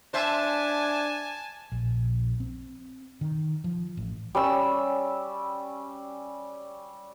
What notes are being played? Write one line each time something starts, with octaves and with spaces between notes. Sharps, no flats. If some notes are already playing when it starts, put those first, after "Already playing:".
D4 C5 E5 G#5 A5
A#1
C4
D#3
F3
A1
G3 C#4 E6